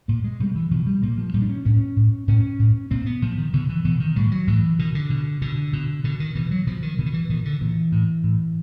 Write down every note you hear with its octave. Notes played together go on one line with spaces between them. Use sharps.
A#2 A#3
G#3
B2 G3
E3
B2 F3
G3
A#2 A#3
F3
A#2 G3
D4
C#4
A2 C#4
A2
A2 C#4
A2
A#2 C4
B3
A#2 F3
D#3
B2 D3
E3
B2 E3
D#3
A2 G3
F#3
A2 E3
B2 D#3
D3
B2
B2 D3
B2
B2 D3
D#3
B2 E3
F#3
B2 F3
D#3
B2 D3
D#3
E3
A#2 D#3
D3
A#2 E3
A2
A2